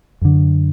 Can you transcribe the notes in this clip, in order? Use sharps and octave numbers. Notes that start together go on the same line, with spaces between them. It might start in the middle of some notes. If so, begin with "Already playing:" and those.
F#2 D3